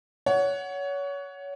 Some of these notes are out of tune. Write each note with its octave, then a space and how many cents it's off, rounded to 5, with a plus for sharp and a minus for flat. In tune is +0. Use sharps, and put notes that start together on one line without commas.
C#5 +25 F#5 +0